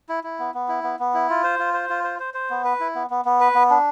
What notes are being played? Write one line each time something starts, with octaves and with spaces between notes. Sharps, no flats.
E4
E4
B3
B3
E4
B3
B3
E4
F4
C5
F4
C5
F4
C5
C5
C5
B3
B4
E4
B3
B3
B3
B4
B3
D4